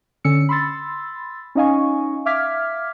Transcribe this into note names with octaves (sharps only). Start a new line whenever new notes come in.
D3 C#4 E6 C#7
B5 C6 E6 A6
C#4 D#4 D#5 F5 G#5 C#6
E5 F5 D6 F6 G#6 B6